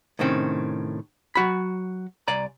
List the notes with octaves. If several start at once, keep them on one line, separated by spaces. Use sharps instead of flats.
A2 C3 D#3 C4 C#4
F#3 F#4 B5
C2 D5 G#5 A#5